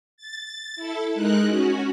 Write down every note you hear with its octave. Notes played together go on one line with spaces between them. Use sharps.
A6
E4 A4
G#3 D#4 A#4 F#6
C#4 F#4